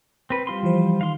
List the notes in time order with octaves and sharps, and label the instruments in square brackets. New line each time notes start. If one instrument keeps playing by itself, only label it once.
[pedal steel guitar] C4 B4
G3 F4 C6
[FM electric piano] E3 F3 C5
[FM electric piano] D#3 [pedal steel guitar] F5 C6